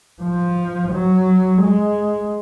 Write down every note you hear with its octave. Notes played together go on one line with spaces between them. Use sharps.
F3
F#3
G#3